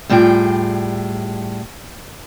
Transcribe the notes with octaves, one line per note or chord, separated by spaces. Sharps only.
A2 G3 F4 G#4 G5